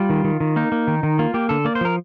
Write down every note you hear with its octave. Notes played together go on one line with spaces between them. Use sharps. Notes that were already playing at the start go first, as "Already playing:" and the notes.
Already playing: G3 F4
D#3
D#3
D#3
A#3 D#4
A#3
D#3
D#3
A#3 F4
A#3 G4
D3 A4
A#3 D5
C5
F3 A#4